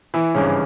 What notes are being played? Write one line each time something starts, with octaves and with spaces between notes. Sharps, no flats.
E3 E4
G#1 G2 C#3 E3 C#4